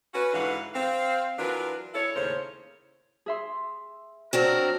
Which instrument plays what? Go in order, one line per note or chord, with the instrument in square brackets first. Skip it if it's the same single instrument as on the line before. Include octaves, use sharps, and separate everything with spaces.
[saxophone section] C#4 F#4 B4
G#2 D3 E3 B4 F5 F#5
C4 F5
E3 F#3 D4 F4 A#4 B4
E4 A4 C#5
D#2 A2 C#3 A#4 C5 C#5
[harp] G#4 E5 C6
[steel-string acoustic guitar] F#3 C4 D4 [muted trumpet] A#4